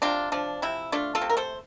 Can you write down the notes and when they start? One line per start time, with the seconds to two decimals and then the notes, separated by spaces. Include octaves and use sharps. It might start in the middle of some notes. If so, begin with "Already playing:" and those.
0.02 C3 D4 F4
0.32 F3 D4
0.62 C3 E4
0.92 A3 D4 F4
1.15 F4 A4
1.22 C3
1.29 A#4
1.37 A4 C5